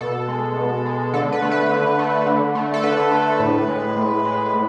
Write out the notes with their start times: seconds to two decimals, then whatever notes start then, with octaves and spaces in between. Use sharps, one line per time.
0.01 B2 A4
0.28 G#3
0.57 B2
0.85 G#3
1.13 D3 A4
1.32 B4
1.42 A3
1.51 B4
1.70 D3
1.99 A3
2.27 D3
2.55 A3
2.74 A4
2.83 D3 B4
3.12 A3
3.40 A2
3.68 G#3
3.96 A2
4.25 G#3
4.53 A2